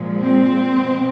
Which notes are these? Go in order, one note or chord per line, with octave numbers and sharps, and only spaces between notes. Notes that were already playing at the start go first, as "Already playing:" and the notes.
Already playing: A#2 F3 G#3
C4
B2